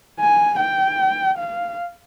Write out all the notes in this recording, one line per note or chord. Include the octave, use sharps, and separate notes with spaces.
G#5
G5
F5